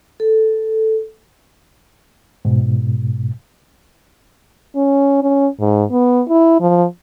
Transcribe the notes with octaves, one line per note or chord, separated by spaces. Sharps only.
A4
G#2 B2
C#4
C#4
G#2
B3
E4
F3